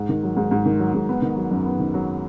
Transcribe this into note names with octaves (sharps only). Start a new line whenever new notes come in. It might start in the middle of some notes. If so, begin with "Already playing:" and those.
Already playing: G#2
D#3
F#3
G#2
G#2
D#3
F#3
G#2
B3
D#3
F#3
F#2
B3
D#3
F#3